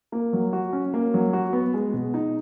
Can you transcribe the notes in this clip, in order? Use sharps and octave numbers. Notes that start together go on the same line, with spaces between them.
A#3
F#3
F#4
C#4
A#3
F#3
F#4
B3
G#3
B2
D#4